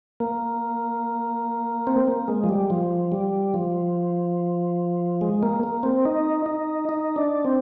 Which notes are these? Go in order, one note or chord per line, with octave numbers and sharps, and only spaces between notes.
A#3
C4
A#3
G#3
F3
G3
F3
G3
F3
G#3
A#3
A#3
C4
D#4
D#4
D#4
D4
C4